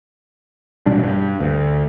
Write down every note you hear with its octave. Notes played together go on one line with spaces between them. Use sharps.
A1 B2 G3 D4
G2
D2